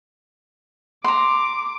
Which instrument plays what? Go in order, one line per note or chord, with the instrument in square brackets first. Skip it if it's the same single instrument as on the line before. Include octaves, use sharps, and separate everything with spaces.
[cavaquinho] A#5 C6 [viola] D6